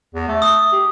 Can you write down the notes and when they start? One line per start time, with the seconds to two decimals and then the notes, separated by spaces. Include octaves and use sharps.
0.14 E2
0.28 A3
0.42 D#6
0.73 G4